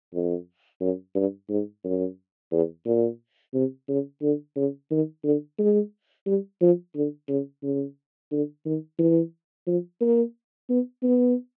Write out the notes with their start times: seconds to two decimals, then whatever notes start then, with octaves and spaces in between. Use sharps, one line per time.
0.14 F2
0.81 F#2
1.15 G2
1.49 G#2
1.84 F#2
2.52 E2
2.86 A#2
3.54 C3
3.89 C#3
4.22 D3
4.56 C#3
4.91 D#3
5.24 D3
5.59 G#3
6.26 G3
6.61 F3
6.95 D3
7.29 C#3
7.63 C#3
8.32 D3
8.66 D#3
8.99 E3
9.67 F3
10.01 A#3
10.70 B3
11.03 B3